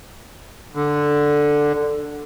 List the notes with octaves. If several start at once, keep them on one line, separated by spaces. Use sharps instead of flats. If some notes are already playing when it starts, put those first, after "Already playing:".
D3